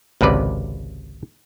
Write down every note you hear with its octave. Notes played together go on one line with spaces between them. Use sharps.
G#1 C#2 C3 B4 D5